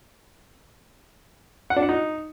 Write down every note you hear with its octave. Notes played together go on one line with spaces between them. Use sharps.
F#5
D4
F#5
D#4